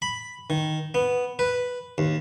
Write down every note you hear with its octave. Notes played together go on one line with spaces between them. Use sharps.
B5
D#3
B3
B4
D#2